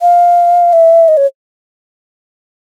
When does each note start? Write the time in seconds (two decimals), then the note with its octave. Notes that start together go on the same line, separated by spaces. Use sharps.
0.02 F5
0.73 E5
1.08 D#5
1.17 C#5